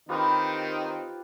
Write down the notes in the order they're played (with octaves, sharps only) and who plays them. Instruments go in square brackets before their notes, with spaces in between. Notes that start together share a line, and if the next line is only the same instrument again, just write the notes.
[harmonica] D#3 C4 D#4 [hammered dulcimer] F4 G4 B4